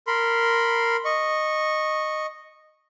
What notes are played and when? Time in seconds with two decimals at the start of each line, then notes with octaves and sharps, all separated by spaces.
0.07 A#4 B5 C6
1.05 D#5 C#6